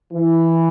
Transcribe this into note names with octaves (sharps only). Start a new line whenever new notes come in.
E3